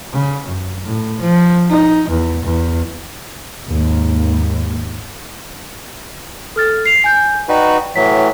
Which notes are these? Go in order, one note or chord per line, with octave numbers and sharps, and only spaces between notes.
C#3
F#2
A2
F3
D#4
E2
E2
D#2 G#2
A4 F6 A6
C7 F7
G#5 G6
D#4 F#4 B4 D5 G5
A2 E3 F#3 B6